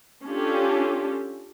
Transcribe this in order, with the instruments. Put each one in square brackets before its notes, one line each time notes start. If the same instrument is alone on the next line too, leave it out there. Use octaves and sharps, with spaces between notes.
[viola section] C#4 D4 F4 G4 A4